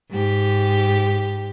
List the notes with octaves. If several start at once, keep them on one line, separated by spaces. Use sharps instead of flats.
G#2 G4